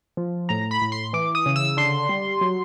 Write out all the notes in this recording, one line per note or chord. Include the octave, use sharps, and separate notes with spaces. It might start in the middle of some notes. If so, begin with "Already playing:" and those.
F3
A2 A#5
B5
A2
C6
E3 D6
D#6
C#3
E6
D3 C6
G3
F#3